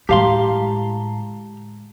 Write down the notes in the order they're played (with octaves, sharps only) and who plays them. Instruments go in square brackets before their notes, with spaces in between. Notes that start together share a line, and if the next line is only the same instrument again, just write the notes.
[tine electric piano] A2 A5 A#5 [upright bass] D3 G#3 [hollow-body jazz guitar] G4 F5 C6